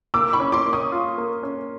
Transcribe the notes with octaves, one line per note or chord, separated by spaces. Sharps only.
A#3 D6 E6
B5 C#6
C#4
C6 D6
A#3
C#6 D#6
F4
A#3
C#4